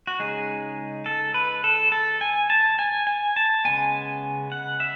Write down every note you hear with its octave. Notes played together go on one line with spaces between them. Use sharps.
F#4
C#3 G#3 D#4 G#4
A4
B4
A4
A4
G#5
A5
G#5
G#5
A5
C#3 G#3 B3 G#5
F#5
E5